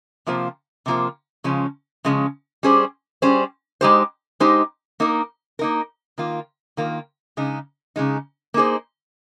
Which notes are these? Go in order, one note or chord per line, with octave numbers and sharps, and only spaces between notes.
C3 F3 A#3 F4 C5
C3 F3 A#3 F4 C5
C#3 F3 G#3 C#4
C#3 F3 G#3 C#4
G3 C#4 G#4 C5
G3 C#4 G#4 C5
G#3 D#4 G4 C5
G#3 D#4 G4 C5
A#3 D#4 A#4
A#3 D#4 A#4
D#3 A#3 F4
D#3 A#3 F4
C#3 G#3 D#4
C#3 G#3 D#4
A#3 D#4 G#4 C5